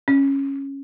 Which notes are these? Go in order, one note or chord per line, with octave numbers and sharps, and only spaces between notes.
C#4